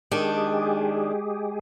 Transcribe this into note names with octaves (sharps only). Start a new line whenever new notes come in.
D#3 G#3 D4 G4 G#4